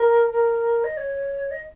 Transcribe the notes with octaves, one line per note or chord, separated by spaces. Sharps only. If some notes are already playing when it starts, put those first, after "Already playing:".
Already playing: A#4
A#4
D#5
C#5
D#5